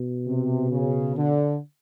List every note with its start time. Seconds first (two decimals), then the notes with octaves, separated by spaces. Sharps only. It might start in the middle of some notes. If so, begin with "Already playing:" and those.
Already playing: B2
0.26 C3
0.71 C#3
1.16 D3